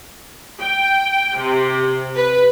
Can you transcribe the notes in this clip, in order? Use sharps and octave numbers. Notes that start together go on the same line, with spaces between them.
G5
C3
B4